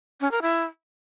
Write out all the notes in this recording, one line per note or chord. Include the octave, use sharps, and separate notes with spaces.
C#4
A#4
E4